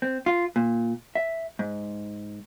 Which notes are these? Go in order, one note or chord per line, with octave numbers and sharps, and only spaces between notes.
C4
F4
A#2
E5
G#2